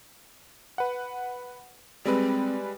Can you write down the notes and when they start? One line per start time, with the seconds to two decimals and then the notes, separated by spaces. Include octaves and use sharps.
0.78 B4 F#5
2.05 G3 G#3 C4 B4